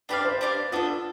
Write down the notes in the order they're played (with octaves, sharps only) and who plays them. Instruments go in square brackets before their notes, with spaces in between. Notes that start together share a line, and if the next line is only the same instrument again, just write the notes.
[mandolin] D4 G4 D5 F5 [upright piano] B4
[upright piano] C5
[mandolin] D4 G4 D5 F5
[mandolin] B3 D4 A4 [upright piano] F4